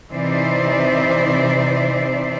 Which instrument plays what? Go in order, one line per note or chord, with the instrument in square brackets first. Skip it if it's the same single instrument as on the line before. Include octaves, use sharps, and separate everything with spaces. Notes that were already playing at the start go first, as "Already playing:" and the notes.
[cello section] C3 E3 D#4 C5 D5 E5